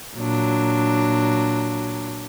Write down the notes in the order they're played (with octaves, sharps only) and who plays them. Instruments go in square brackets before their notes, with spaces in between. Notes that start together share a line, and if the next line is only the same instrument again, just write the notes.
[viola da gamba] A#2 F#3 D4